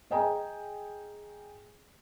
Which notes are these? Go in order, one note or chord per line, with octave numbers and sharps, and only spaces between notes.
G#4 D#5 G5 G#5 A#5